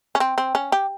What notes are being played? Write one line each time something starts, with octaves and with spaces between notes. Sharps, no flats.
C#4
C4
C4
C#4
G4